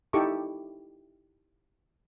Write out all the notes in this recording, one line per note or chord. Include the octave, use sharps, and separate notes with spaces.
D#4 E4 G4 A4 C#6 D6